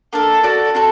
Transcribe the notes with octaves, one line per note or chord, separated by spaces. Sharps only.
A#3 D4 A4
F#4 A4 D5
C4 F#4 A4